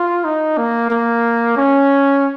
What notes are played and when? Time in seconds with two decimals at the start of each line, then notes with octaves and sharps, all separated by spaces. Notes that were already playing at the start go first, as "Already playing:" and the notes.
Already playing: F4
0.25 D#4
0.58 A#3
0.91 A#3
1.57 C#4